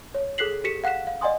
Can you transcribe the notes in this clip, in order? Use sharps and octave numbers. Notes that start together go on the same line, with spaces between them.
C#5
G#4 A4 F#6 B6 C7 F#7
G4 A4 B6 C#7 E7
F5 F#5 F#6 B6 E7
F5
D5 D#5 F#5 G#5 C6 D#6